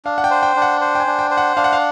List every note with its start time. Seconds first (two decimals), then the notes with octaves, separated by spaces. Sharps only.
0.05 D4 F5
0.18 F#5
0.24 G5
0.31 C5
0.43 G5
0.56 D4
0.62 F#5
0.81 C5
0.95 G5
1.00 G#5
1.07 D4
1.19 G5
1.31 C5
1.37 F#5
1.56 D4 F5
1.64 F#5
1.73 F5